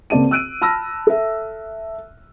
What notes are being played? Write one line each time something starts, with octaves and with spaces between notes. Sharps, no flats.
C#2 A#3 C4 D5 A5 D#7
E6 F#6 D7 D#7
A5 B5 E6 F6 A#6
A4 E5